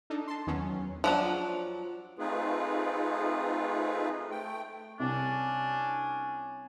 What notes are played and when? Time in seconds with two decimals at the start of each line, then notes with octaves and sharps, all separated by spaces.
0.10 D4 D#4 A4
0.28 A5 C6
0.47 E2 D#3 F#3 B3 C#4
1.04 F3 F#3 D4
2.19 A3 C4 D#4 F4 G#4 B4
4.31 A3 G5
5.00 C2 C#4 D4